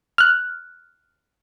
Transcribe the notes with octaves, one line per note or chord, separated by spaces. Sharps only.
F6 F#6